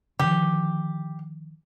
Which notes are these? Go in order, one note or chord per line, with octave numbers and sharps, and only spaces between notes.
D3 D#3 F3 G4